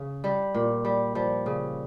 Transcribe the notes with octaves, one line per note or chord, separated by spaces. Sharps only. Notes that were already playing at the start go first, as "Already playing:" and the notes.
Already playing: C#3
G3
A#2
G3
F3 G3
C#3